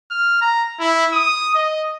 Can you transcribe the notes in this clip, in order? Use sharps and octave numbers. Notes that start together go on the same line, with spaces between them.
F6
A#5
E4
D#6
D#5